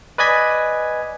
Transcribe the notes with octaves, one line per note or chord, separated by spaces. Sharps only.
B4 D5 D#5 G#5 G#6 B6